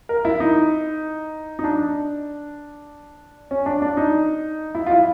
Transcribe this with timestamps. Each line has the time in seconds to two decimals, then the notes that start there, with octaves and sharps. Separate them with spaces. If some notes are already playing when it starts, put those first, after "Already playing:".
0.09 A#4
0.25 E4
0.40 D#4
1.59 D#4
1.64 D4
3.51 C#4
3.66 D4
3.82 D4
3.97 D#4
4.75 E4
4.86 F4
4.90 E4